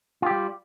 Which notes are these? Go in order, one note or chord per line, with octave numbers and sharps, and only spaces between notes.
G3 F4 G4